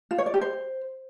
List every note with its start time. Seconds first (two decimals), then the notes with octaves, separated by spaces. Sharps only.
0.11 F4
0.18 C#5
0.26 D5
0.34 G4
0.41 C5